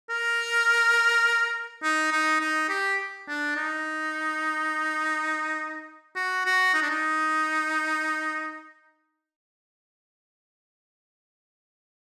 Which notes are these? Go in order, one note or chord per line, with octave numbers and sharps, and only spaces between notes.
A#4
D#4
D#4
D#4
G4
D4
D#4
F#4
F#4
D#4
D4
D#4